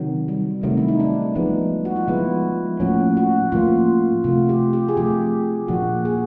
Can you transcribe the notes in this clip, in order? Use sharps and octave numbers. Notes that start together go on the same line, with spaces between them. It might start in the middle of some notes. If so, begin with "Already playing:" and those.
Already playing: C3 D#3 F#3
G3
C3 D#3 F#3 A3
E4
D#4
D4
F3 G#3 B3 D#4
F#4
F4
F3 G#3 B3 E4
A2 F3 A#3 C#4 F#4
F#4
A2 F3 A#3 C#4 F4
C3 F3 A3 F4
G4
G4
G#4
C3 F3 A3 G4
A#2 F3 A#3 D4 F#4
G#4